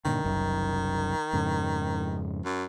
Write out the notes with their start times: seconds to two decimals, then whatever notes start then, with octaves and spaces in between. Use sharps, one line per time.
0.05 G2 A#2 D3 D#3
0.24 F#1 C2 F#2
1.33 F2 G#2 C#3
2.45 F#2